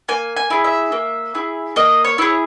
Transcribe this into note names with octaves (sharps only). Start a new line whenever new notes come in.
A#3 G#5
G#5
E4 G#4
E5
A#3
E4 G#4
A#3 D#5
C#5
E4 G#4